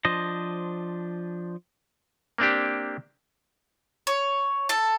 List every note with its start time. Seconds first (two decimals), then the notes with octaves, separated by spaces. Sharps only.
0.05 F3 D4 C5 D#5
2.38 A#3 C4 D4 G4
4.07 C#5
4.69 A4 A5